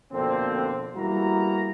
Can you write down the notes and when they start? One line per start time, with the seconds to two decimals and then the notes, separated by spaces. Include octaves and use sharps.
0.12 F2 B2 D3 A#3 C4
0.96 E2 G3 A#3 E4 F#4 A#5